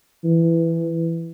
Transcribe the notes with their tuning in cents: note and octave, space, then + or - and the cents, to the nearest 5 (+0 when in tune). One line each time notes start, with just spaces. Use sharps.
E3 +10